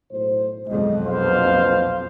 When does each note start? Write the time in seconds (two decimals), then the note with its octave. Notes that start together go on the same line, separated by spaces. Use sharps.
0.11 B1 A2 C5
0.67 B1 F2 G#3 D#5
1.06 A#1 B2 C5 F5